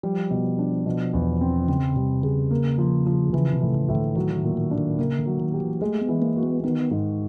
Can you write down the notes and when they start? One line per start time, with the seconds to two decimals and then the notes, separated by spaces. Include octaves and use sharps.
0.03 F3 G3
0.31 B2
0.58 D4
0.86 B2
1.13 E2
1.41 C4
1.68 C#3 C4
1.96 C3 G3
2.23 C#3 G#4
2.51 A#3
2.78 F3
3.06 F3
3.33 C#3 E3
3.54 C3
3.61 A2
3.74 C#3
3.89 A2
3.95 D3
4.16 D#3 F#3
4.36 D#3
4.43 A#2
4.57 D#3
4.71 D4
4.78 D#3
4.98 C#3 A#3
5.19 D3
5.26 F#3
5.40 D#3
5.54 G4
5.60 E3
5.81 G#3 A3
6.01 B3
6.09 E3
6.22 A#3
6.36 F#4
6.43 B3
6.64 D#3 B3
6.91 G#2